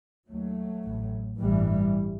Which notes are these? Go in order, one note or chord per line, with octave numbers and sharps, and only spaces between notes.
D#2 F#3 A3
A1 A2
A1 G2 E3 G3